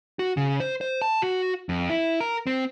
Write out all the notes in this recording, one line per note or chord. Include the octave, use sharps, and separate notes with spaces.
F#4
C#3
C5
C5
A5
F#4
F2
E4
A#4
C4